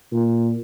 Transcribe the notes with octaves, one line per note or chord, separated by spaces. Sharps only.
A#2